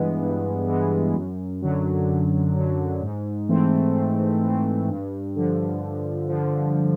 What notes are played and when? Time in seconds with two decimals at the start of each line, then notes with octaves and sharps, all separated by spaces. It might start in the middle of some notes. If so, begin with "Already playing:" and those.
Already playing: G2 E3 G#3 B3
0.22 G2
0.68 E3 G#3 B3
1.14 F#2
1.62 D3 F#3
2.09 F#2
2.55 D3 F#3
3.02 G#2
3.49 E3 A3 C4
3.94 G#2
4.41 E3 A3 C4
4.88 G2
5.35 D3 F3
5.82 G2
6.29 D3 F3